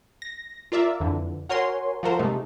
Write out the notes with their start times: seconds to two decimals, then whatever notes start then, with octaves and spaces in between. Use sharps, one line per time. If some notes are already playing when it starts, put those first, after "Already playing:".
0.22 A#6
0.72 F4 A#4 D5 E5
1.00 F2 D3 E3
1.49 F#4 A#4 C#5 G#5 C6
2.03 F3 F#4 A4 A#4 C5
2.19 C3 G#3 A3 D#4